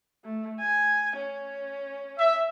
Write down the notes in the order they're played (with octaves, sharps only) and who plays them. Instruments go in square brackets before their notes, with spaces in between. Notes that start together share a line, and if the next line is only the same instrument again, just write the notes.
[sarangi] A3
G#5
C#4
[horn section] E5